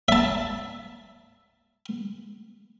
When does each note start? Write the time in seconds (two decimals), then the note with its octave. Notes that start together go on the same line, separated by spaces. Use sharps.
0.08 E5 A5